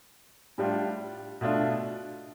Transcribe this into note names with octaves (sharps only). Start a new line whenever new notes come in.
A2 G3 D4 F4
B2 A3 D4 F4